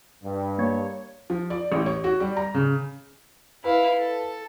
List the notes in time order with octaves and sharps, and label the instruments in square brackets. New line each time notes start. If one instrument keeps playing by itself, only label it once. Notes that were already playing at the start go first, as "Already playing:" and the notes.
[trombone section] G2
[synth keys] A#3 C#5
[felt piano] F3
D5
A1
C#5
F#4
G3
A#5
C#3
[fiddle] E4 F5 [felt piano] B4
[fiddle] A4